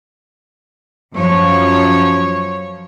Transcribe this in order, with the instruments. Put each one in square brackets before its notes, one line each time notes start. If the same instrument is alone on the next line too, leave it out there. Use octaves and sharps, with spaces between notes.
[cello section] F#2 F3 C#5